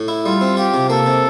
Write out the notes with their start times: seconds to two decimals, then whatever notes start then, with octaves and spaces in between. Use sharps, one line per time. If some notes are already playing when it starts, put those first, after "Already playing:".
Already playing: A2
0.08 E4
0.26 G3 F4
0.41 C4
0.57 F4 G4
0.74 C3
0.90 A#3 A4
1.06 C3